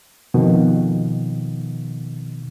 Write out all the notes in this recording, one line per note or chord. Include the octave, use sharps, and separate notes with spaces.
F2 B2 D#3